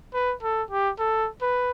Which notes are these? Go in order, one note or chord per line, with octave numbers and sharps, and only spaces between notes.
B4
A4
G4
A4
B4